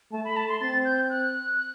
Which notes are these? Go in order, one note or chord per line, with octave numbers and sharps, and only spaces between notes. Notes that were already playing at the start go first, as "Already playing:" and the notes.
A3 A5
B5
A5
C6
C4 A6
G6
F#6